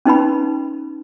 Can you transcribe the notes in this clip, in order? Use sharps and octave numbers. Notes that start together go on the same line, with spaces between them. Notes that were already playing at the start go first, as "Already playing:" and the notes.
C#4 D#4 B4 B5